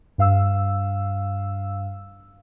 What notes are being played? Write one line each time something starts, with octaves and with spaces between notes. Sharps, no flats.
G2 F5 E6